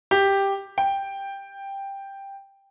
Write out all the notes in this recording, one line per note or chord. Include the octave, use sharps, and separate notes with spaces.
G4
G5